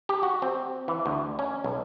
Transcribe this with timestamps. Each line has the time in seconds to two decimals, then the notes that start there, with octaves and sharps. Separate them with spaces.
0.09 G4
0.23 F#4
0.42 C4
0.88 E3
1.06 D2
1.39 C#4
1.64 B1